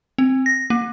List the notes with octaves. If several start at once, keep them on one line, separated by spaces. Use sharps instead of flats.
C4
A#6
A#3